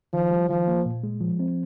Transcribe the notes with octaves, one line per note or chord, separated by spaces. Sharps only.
D#3 F3
G3
D#3 F3
A#3
A#2
G#3
F3
C4